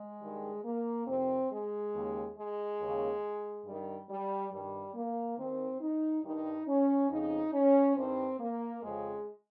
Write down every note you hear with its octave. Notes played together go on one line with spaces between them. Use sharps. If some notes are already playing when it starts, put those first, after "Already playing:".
Already playing: G#3
G2 D#3
A#3
F2 C3 D#3 C4
G#3
D#2 C#3
G#3
D#2 C#3
G2 D#3 G3
G3
G2 D#3 G3
A#3
D#2 D#3 C4
D#4
G2 D#3 D#4
C#4
F2 C#3 D#4
C#4
G2 D#3 C4
A#3
F2 C#3 G#3